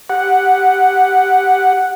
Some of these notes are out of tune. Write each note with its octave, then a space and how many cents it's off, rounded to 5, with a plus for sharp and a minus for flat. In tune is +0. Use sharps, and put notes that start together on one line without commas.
G4 +0 F#5 +0